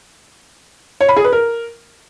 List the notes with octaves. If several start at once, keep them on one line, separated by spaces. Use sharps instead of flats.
C#5
B5
G#4
B4
A#4